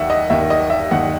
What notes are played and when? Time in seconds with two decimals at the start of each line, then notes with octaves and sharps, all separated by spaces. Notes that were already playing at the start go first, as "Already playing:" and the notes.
Already playing: D#2 D#3 E5 F#5
0.10 D#5
0.30 D#2 D#3 E5
0.50 D#5
0.70 E5
0.91 D#2 D#3 F#5